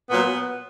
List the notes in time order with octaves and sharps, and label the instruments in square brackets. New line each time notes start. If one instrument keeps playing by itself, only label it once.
[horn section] A#2 F#3 B3